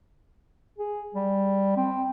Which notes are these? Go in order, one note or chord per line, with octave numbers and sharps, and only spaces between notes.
G#4
G3
C4